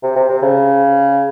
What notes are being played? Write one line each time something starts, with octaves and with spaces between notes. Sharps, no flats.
C3
C3
C3
C#3